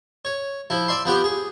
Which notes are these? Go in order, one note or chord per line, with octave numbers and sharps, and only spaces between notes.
C#5
F3 E4
D5 E5 C6
F3 B3 G4
G#4